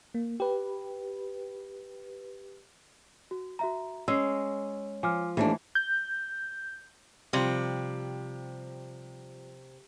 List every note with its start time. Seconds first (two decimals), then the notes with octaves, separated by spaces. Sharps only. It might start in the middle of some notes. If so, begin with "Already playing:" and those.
0.14 A#3
0.40 G4 B4
3.31 F#4
3.59 F#4 E5 A#5
4.08 G#3 C#4 E6 C7
5.03 F3 G#5 D6 F6
5.37 D#2 E3 A3 D4 C5
5.75 G6
7.33 C3 F3 G3